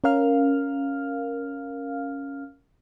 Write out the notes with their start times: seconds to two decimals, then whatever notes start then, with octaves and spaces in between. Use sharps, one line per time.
0.04 C#4 A#4 F5 F6